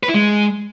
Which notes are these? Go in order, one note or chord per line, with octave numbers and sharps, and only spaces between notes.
B4
E4
G#3